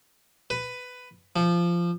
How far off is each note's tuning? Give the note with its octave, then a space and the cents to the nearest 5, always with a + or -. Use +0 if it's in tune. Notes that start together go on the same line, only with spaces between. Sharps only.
B4 +10
F3 -15